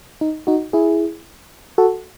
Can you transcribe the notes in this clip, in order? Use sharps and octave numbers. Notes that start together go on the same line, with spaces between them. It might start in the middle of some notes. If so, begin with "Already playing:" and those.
D#4
D#4 F#4
E4 G#4
F#4 A4